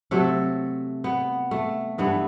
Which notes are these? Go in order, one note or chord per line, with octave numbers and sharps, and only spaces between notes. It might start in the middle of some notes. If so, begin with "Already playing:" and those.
C3 F#3 A3 A4
B3
A3
G2 E3 A3 B3